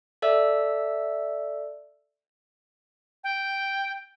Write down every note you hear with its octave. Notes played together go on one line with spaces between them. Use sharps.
A4 D5 E5 E6
G5